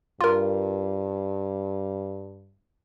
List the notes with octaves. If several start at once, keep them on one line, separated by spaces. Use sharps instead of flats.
G2 F4 A#4